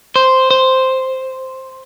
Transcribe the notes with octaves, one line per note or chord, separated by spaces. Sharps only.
C5
C5